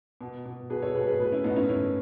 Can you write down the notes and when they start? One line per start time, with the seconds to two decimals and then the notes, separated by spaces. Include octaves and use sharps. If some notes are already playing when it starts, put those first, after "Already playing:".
0.21 B2
0.46 B2
0.70 B2 G#4 B4
0.82 A4 C#5
0.95 B2 G#4 B4
1.07 G#4 B4
1.19 A2 G#4 B4
1.32 C#4 E4
1.44 A2 B3 D#4
1.56 C#4 E4
1.69 A2 C#4 E4